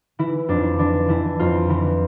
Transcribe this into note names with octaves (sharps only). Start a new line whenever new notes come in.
E3 E4
F2 D4
E3 D4
E3 E4
F2 F4
E3 E4